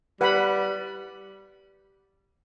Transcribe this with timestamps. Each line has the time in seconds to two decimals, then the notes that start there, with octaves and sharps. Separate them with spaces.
0.21 G3 B4 F#5 B5